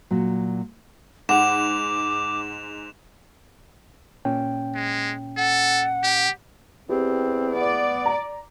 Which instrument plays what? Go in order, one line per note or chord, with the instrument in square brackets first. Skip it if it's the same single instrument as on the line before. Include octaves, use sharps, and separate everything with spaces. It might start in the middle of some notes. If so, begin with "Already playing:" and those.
[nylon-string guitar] A#2 F#3
[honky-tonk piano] G#2 [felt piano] F#5 [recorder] D6 [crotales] E7 F7
[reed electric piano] A#2 C#4 G5
[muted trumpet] G#3
[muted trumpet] A4 [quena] F#5
[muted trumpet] G4
[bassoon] E2 [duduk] C4 [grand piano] G4
[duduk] B3 [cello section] D5
[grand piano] A#5